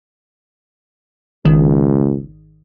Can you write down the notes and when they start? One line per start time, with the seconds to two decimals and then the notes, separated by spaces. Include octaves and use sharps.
1.45 G#1 C#2 D#3